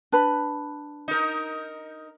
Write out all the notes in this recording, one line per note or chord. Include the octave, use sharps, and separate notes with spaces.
D4 B4 B5
D#4 A#4